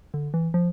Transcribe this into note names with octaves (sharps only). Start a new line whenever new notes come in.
D3
E3
F3